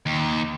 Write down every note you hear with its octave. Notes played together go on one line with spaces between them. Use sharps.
D#2